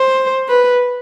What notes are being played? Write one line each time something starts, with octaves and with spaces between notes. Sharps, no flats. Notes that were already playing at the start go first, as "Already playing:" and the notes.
Already playing: C5
B4